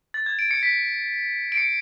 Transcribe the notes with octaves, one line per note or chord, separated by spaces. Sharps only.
A6
G#6
D7
C#7
B6
D7
C#7